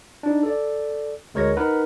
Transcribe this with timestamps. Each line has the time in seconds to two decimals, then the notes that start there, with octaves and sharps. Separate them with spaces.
0.23 D4 D#4
0.43 A4 D5
1.34 D2 G#3 A#4 C#5 G#6 A#6
1.57 D#4 A#4 B4 F#5